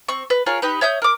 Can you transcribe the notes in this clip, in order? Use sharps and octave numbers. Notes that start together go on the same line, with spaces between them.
C4 C#6
B4
F4 G#4 A#4 C#5
D#4 G4 B4
C#5 E5 D#6 G6
A#4 D6